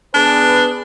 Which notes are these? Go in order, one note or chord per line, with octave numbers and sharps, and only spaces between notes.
B3 D4 G#4 B4